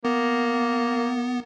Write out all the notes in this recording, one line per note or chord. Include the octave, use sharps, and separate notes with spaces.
A#3 B3